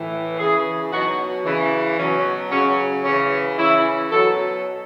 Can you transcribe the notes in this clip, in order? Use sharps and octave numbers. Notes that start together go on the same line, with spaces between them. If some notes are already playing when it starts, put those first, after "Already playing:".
Already playing: A2 E3
C#3 E3 E4 G#4
B2 F#3 D#4 F#4
C#3 E3
B2 F#3 C#4
C#3 F#3 C#4
C#3 E3 C#4
C#3 E3 C#4 E4
B2 F#3 F#4 A4